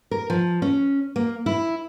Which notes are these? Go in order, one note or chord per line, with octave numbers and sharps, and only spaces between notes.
A#4
F3
C#4
A#3
E4